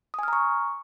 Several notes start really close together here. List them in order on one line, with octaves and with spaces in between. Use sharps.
D#6 G#5 F6 A#5 C#6